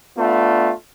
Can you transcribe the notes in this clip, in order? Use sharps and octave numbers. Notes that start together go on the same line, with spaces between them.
A3 B3 D4 F4